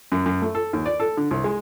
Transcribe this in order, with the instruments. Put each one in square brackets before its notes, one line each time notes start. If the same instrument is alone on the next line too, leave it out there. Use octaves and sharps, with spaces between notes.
[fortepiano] F#2
F#2
A3
A4
D#2
D5
A4
D3
C2
G#3